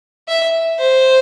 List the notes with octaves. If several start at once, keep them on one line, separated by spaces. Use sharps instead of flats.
E5
C5